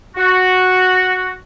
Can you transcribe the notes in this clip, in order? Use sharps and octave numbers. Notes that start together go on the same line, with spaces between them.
F#4